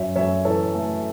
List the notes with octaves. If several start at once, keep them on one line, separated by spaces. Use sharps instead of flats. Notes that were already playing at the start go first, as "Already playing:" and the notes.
Already playing: F#2 C#5 E5
F#2 C#5 E5
E3 A4 C#5
A3